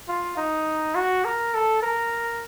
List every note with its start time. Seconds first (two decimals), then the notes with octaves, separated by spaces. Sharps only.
0.09 F4
0.37 D#4
0.95 F#4
1.25 A#4
1.55 A4
1.83 A#4